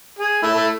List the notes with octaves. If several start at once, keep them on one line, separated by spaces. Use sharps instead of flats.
G#4
A3 E4
A3